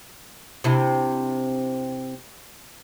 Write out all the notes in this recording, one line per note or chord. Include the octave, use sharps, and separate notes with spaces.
C3 D4 E4